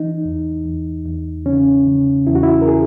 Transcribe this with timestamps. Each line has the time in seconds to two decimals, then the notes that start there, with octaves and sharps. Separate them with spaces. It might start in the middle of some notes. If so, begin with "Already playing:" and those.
Already playing: E3 D#4
0.25 E2
0.65 E2
1.05 E2
1.46 C#3 C#4
1.87 C#3
2.27 E2 E4
2.35 F#4
2.43 E4
2.62 A#4
2.67 G#4